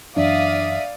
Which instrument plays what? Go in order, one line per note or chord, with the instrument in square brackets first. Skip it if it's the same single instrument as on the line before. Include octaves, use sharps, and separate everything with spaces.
[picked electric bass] F#2 E3 F#3 [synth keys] D4 [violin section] D5 F5 D#6 [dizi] E5